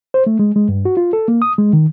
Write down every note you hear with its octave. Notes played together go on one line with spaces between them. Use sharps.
C5
A3
G#3
G#3
G2
F#4
F4
A4
A#3
D#6
G#3
D#3